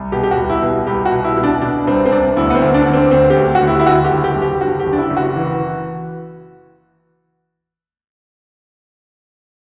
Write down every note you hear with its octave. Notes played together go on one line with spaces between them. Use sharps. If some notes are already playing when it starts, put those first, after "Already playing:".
Already playing: C2
B2 G4
G4
F#4
C2
E4
B2
C2 G4
F#4
B2
E4
B2
D4
B2 D4
C2 C4
C4
C2 D4
D2 E4
B3
C4
D2
D4
D3
C4
D2 C4
G4
D2
F#4
D2
E4
E4
D3 F#4
G4
F#1
G4
F#1
G4
D3 F#4
G4
F#1
D4
E4
F#1
F#4
E3